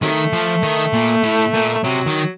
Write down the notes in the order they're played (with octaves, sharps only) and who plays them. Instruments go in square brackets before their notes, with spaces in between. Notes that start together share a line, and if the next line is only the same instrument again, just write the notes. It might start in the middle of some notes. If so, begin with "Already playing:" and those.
[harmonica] C3 F#3 A3 [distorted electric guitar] D#3
[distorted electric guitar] F3
D#3
A#2
A2
A#2
[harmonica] A3
[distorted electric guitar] C3 [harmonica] F#3
[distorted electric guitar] D#3